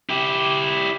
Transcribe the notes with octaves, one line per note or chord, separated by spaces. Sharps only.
E4 G4